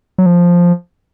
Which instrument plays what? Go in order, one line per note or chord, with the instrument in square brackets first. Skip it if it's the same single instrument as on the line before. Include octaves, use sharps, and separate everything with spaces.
[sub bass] F#3
F3